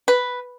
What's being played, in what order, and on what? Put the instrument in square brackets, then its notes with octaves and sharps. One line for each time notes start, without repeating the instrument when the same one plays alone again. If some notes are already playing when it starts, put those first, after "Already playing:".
[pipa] B4